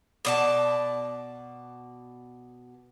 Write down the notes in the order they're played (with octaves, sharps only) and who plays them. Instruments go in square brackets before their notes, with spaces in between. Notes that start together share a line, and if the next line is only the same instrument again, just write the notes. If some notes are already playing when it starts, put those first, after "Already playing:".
[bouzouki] B2 D5 A5